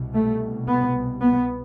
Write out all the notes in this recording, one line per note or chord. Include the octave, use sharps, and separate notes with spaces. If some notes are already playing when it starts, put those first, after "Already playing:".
Already playing: C2 B2
A3
B3
B3